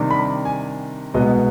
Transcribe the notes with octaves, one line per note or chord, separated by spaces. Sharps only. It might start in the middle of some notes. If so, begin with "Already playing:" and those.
Already playing: C3 D#3 G3 D4
B5
G#5
C2 B2 G#3 B3 D#5